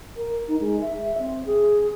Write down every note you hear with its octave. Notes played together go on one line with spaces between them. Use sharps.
A#4
D#4
G#3
E5
C4
G#4